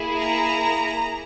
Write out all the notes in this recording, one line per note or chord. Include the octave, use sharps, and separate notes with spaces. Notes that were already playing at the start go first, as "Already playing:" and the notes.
Already playing: A#3 E4 G#4
A#5